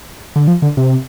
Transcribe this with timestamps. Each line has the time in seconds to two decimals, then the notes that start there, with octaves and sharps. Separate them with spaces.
0.36 D3
0.48 F3
0.62 D3
0.77 C3